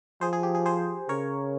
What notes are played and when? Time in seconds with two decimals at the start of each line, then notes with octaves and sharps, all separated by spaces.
0.21 F3 G#4 C5
0.33 G#4
0.43 G4
0.55 G#4
0.65 G#4 C5
1.09 C#3 A#4 C#5